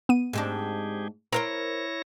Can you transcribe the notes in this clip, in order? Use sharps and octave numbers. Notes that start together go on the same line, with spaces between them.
B3 D#7
G#2 C4 D4 G4 G#4
C4 E4 A#4 C5 C#5 A#5 A#6